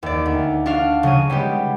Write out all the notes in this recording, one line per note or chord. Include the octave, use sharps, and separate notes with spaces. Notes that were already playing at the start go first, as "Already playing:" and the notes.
D#2 D5
D2
D4 F#4 F5
C#3 F#3 G#4 D#7
G3 G#3 B3 G4